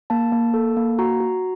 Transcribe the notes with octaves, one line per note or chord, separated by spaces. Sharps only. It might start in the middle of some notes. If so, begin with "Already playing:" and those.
A#3 A5
A#3
A4
A#3
F#4 A#5
F#4